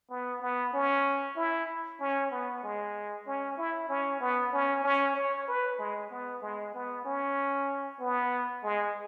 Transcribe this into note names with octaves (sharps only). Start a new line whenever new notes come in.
B3
B3
C#4
E4
C#4
B3
G#3
C#4
E4
C#4
B3
C#4
C#4
C#5
B4
G#3
B3
G#3
B3
C#4
B3
G#3